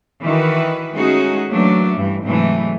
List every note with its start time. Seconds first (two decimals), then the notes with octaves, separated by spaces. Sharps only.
0.22 D#3 E3 F#4 B4
0.95 G#3 A3 C#4 D#4 F#4 G#4
1.50 E3 F#3 A3 A#3 C#4 D4
1.94 G2 E3
2.23 G#2 C3 E3 F#3 G#3 A3